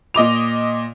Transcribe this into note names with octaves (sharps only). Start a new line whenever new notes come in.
A#2 D#5 D6 F7